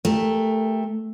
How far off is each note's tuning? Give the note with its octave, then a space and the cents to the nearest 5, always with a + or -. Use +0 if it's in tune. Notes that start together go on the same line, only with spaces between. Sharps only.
A3 +0 G4 +20 A#4 -10